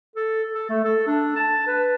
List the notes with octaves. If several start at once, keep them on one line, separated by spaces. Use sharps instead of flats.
A4
A4
A3
A4
D4
A5
B4